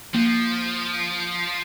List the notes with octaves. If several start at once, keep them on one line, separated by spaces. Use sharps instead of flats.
F3 A#3